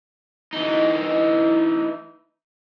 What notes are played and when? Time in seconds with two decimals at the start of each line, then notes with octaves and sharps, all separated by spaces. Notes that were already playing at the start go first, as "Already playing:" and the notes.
0.53 E3 D#4